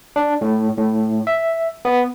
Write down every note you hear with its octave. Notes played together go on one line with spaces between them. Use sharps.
D4
A2
A2
E5
B3